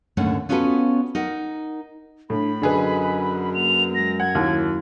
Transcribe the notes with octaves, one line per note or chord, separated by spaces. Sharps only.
D#2 G#2 D3 A3 C#4 F#5
B3 C#4 F4 F#4 A4 B4
D#4 A#4 F#5
A2 D4 B5
F#2 D3 G#4 B4 D#5
A#3 F7
G#3 A#6
F#5 G#6
D#2 E4